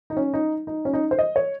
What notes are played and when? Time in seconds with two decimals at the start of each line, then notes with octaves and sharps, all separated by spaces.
0.10 D#4
0.17 C#4
0.34 D#4
0.67 D#4
0.85 C#4
0.93 D#4
1.11 C5
1.19 D#5
1.36 C#5